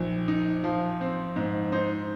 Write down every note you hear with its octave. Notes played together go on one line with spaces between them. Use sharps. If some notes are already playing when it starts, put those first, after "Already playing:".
Already playing: A#1 D#3
D#4
F3
C4
G#2
D#4 C5